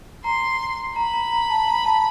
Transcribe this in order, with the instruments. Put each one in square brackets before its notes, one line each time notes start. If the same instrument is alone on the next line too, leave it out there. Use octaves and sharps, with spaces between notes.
[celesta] A#5 [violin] C6
[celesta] A#5 [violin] B5
[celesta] A#5
A#5
A5
A#5
A5